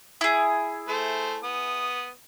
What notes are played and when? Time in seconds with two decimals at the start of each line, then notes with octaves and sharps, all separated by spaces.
0.21 E4 G#4
0.88 A3 C5
1.43 B3 D#6